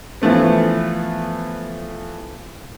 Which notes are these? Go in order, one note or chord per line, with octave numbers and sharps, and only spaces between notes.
E3 F3 A3 B3